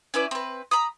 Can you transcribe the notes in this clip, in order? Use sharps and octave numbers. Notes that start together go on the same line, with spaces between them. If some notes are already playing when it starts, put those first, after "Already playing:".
C#4 E4 B4 D5
C4 B4
A#5 B5 D#6